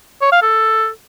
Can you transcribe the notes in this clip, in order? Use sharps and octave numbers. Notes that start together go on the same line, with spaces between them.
C#5
F5
A4